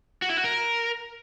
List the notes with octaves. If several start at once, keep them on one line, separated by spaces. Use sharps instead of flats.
F#4
E4
F#4
A#4